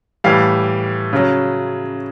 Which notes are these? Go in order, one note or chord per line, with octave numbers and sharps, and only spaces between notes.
A2 E3 G3 F5
C#3 F#3